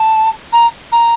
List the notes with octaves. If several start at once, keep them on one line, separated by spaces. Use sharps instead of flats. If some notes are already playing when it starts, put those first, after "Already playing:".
Already playing: A5
A#5
A#5